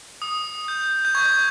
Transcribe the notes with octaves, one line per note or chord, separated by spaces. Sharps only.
D#6
G6
G6
C#6 G#6